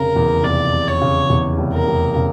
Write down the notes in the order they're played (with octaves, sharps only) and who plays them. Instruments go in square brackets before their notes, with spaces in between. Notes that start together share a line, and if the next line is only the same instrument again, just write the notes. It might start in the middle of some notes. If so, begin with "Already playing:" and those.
Already playing: [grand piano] F1 C#3 [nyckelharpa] A#4
[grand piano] E2
[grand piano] F1 [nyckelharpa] D5
[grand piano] F1
[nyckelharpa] C#5
[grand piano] C#3
E2
F1
[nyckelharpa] A#4
[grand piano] F1
C#3